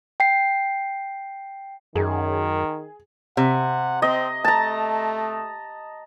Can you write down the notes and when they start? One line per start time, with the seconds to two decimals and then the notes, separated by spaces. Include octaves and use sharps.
0.20 G5 C7
1.95 F#2 D#3 G#4
3.37 C3 F#5
4.02 C4 D#5
4.44 A3 A5 A#5